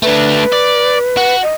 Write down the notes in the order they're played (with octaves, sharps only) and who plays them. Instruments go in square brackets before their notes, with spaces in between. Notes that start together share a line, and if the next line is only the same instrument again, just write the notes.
[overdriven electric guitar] A3 D4 [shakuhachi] B4
[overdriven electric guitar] D5
F#4
[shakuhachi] D#5